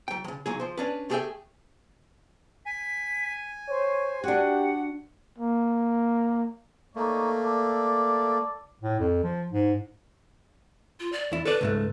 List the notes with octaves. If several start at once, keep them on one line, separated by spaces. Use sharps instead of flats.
F#3 G5
C#3 F3
B1 F#3 G#4
F3 C5
C#4 D4 B4
A3 G4 G#4 A#4 E5 G5
G#5 B6
C5 C#5
D4 F#4 G4 F#5
A#3
A3 A#3 D#4 C#5 D5
A4 D5
A2
F2
F3
G#2
F4
D5
E2 E4
A4 B4 D5
C#2 G#2 A3